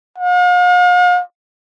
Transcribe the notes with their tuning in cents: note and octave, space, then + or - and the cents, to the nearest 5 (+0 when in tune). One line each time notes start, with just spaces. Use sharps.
F5 +45